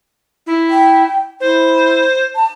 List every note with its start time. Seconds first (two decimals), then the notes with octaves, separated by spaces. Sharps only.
0.47 E4
0.70 G5
1.40 E4 C5
2.35 A5